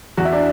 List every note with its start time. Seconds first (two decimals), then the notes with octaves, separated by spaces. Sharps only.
0.17 E2 F#4
0.25 E4
0.32 D4